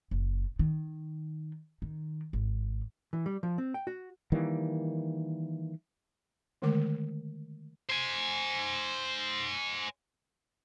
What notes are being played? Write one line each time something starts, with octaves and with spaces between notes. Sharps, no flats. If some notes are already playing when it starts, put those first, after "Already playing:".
F#1
D#3
D#3
G#1
E3
G3
F3
C4
G5
F#4
D#3 E3 G3 A#3
D3 D#3 G#3 A3 A#4 D6
C5 G#5